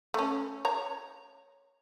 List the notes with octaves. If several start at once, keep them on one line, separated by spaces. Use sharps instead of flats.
A3 C#4
C#5 A#5